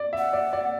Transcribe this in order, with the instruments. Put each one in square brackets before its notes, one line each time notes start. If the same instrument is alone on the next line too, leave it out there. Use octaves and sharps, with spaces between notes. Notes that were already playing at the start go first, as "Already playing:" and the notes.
Already playing: [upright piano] D5
E5
[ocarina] F#5
[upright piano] D5
D5